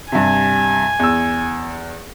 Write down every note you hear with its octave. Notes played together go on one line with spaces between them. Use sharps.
G2 C3 G#5
E2 E6